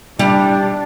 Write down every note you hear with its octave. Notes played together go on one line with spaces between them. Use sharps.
G3 D4